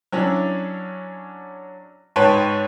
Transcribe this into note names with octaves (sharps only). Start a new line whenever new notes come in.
F#3 C#4 D4 E4
G#2 B4 C#5 G5 A5